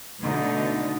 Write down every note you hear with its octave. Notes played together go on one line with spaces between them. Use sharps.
B2 D3 A3 D#4